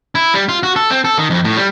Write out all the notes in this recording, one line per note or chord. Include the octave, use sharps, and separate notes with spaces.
E4
G3
F4
F#4
A4
C4
A4
D#3
F2
A2
G3